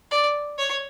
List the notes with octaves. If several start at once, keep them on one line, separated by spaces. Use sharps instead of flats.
D5
C#5